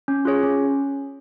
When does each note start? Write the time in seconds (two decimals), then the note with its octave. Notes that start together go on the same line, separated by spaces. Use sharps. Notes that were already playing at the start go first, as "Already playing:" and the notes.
0.08 C#4
0.25 F4 G#4 C#5
0.43 C#4